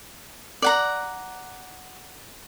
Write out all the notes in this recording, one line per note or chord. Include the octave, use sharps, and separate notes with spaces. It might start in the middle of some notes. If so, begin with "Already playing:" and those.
D5 F#5 A#5